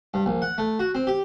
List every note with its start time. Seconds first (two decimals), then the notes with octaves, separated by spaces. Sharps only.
0.14 G2
0.26 A#1
0.42 F#5
0.58 A3
0.79 F#4
0.95 C4
1.07 G4